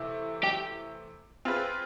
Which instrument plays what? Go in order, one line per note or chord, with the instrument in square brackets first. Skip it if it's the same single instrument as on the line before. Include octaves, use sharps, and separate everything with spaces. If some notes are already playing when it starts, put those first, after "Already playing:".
Already playing: [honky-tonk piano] C3 E3 A3
[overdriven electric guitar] G4
[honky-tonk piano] C4 F4 G#4 B4